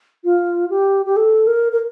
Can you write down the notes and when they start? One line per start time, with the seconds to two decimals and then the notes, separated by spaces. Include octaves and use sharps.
0.24 F4
0.70 G4
1.06 G4
1.16 A4
1.47 A#4
1.72 A#4